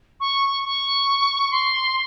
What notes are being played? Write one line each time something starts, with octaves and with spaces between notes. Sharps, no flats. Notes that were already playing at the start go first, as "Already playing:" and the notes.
C#6
C#6
C6